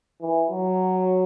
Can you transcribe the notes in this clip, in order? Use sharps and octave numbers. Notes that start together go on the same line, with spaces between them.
E3
F#3